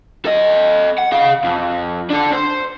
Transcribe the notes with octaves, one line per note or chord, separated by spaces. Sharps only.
A4 D#5
F#5
G#4 F5
F2
D4 A4
C5